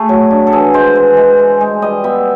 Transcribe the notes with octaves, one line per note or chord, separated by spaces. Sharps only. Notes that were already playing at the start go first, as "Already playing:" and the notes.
Already playing: A3 G#4
F#3
D4
A4
E3 G#4
G#3 C5
E3
G#3
E3
G#3
G3 D#5
B3 E5